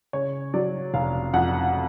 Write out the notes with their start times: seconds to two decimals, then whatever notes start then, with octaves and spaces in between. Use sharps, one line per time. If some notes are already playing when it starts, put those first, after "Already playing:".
0.13 C#3 C#5
0.54 F#3 D5
0.94 F1 F5
1.34 F2 F#5